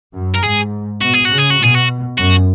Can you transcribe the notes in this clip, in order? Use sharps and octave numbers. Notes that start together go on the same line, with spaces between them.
F#2
A#4
G#2 G#4
B2 F#4
G#4
F#4
C#3
G#4
F#4
B2 G#4
F#4
F#2 F#4